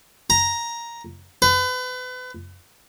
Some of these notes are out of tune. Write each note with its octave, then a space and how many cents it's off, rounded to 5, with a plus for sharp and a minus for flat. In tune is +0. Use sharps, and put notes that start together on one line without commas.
A#5 +5
B4 +35